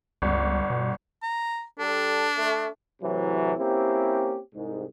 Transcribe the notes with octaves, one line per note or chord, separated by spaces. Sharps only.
G1 C#2
B2
A#5
G3 D4 A4
A3
A2 C3 E3 F#3
A#3 C4 C#4 E4 G4
C2 G#2